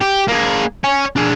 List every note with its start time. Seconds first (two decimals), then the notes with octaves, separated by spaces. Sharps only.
0.01 G4
0.28 A#3 G#4
0.84 C#5 G#5
1.16 D4 G#4